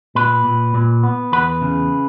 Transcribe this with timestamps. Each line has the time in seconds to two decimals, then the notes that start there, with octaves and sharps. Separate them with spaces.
0.15 A#2 B4
0.44 A#2
0.74 A#2
1.03 B3
1.32 E2 B4
1.62 C#3